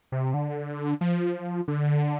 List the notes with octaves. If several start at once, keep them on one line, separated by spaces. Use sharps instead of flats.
C3
D3
F3
D3